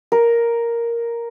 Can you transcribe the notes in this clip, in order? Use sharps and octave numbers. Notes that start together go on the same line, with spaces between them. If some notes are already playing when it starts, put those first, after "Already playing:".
A#4